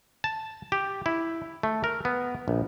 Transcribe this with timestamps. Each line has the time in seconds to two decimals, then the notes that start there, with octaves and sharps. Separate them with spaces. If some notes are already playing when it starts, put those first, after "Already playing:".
0.24 A5
0.72 G4
1.06 E4
1.63 A3
1.84 A#4
2.05 B3
2.48 A#1